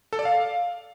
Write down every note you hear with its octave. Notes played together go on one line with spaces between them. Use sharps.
A4
D5
F5